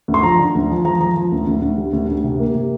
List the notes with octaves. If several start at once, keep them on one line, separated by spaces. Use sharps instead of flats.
D2
C6
F3 A#5
D3
D2
F3
F3 A#5
F3 A#5
F3
D2
D2
D2
G3
D2
D2
C3
A#3
C3